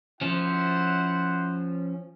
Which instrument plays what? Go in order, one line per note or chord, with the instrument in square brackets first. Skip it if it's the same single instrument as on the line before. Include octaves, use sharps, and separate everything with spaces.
[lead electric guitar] F3 C#4 [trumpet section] E4 C5 F#5